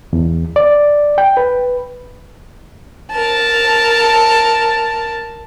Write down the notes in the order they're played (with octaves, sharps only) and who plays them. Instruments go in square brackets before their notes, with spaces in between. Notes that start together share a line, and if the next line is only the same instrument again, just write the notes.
[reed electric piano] E2
D5
G5
B4
[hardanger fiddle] A#4 A5